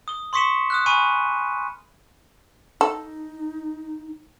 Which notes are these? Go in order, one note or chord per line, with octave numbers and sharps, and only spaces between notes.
D#6 G7
C6 C#6 D#6 B6 C#7 E7
D#6 F6 F#6
G#5 B5 C#6 D#6 D#7
D#4 A4